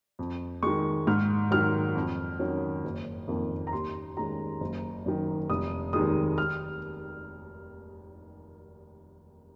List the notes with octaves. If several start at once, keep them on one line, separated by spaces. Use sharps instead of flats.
F2
D#3 G#3 C#6
G#2 F6
D#3 F#3 F6
F2
D#3 F#3 C#4
F#1
F2 D#3 A#3
A#5
D#2 C6
D#3 G#3 C#4 A#5
F#1
F#2 D#3
F1 D#6
D#2 D#3 G#3 D#6
F6